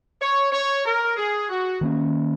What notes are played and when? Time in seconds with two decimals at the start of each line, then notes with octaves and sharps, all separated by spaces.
0.20 C#5
0.52 C#5
0.85 A#4
1.17 G#4
1.49 F#4
1.81 D#3 A#3 C#4